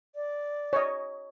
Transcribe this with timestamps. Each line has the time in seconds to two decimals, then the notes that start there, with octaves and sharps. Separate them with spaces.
0.15 D5
0.73 C#5 D#5